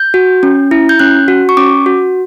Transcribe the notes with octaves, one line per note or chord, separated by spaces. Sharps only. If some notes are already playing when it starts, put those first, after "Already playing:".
Already playing: G6
F#4
C#4
E4
G6
C#4 F#6
F#4
C#6
C#4 D6
F#4